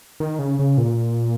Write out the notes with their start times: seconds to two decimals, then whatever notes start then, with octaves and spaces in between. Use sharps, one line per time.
0.20 D#3
0.39 C#3
0.59 C#3
0.78 A#2